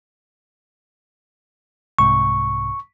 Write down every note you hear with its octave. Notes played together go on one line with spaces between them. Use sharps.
C2 G#2 C3 C#6